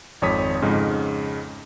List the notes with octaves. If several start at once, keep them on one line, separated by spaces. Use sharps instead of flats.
G#1 F2 C#5 D#6 B6
F2 G#2 C#3